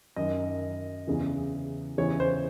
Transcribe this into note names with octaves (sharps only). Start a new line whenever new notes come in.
F#2 D#3 D#5
E2 C#3 E3
E2 C#3 E3 C#5
C5